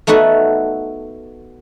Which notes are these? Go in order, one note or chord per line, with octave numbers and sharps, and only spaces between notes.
A3 B3 D#4 F#4 A4